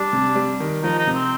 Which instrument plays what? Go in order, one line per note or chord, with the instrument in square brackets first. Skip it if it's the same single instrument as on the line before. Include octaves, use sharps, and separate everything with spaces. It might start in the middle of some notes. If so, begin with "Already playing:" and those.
Already playing: [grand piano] G3 [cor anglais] D4
[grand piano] C3
G3
D#3
[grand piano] F3 [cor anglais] D#4
[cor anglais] D#4
[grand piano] C3
[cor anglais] C4